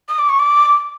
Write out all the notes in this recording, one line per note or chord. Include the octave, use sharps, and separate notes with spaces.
D#6
D6
C#6
D6